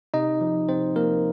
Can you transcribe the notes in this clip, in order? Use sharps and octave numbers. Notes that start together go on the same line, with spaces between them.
C3 D#4 D#5
F3
C3 C4 C5
F3 A#3 A#4